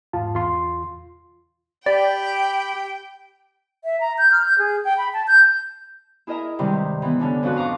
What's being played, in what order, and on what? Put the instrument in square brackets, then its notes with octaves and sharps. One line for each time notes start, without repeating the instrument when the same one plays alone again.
[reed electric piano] E2 G#2 F4 A5
E2 F4 C6
[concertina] G4 B5 [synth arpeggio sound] D5 [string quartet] G5
[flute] E5
A#5
G6
F6
G6
G#4
G5
B5
A5
G6
[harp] E4 G#4 A#4 D#5 E5 A#5
G2 C3 D#3 G3 G#3
E3 B3
D3 C#4 D4
F2 G#2 D4 F#4 B4
F5 A#5 C#6 D6